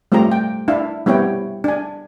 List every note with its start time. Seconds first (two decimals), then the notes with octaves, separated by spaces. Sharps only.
0.12 G3 A3 C4 F4 G4 A#5
0.32 G5
0.68 D4 E4 E5 F5
1.06 G3 B3 C4 E4 C#5 G5
1.64 D4 G#5